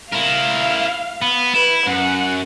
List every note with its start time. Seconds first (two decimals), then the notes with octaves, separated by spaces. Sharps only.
0.13 E4 A#4 F5
1.22 B3
1.54 E4 B4
1.86 F#2 F#5